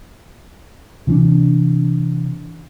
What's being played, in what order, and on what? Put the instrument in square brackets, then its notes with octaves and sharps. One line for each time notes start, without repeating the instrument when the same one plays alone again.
[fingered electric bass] C3 E3 C4 D4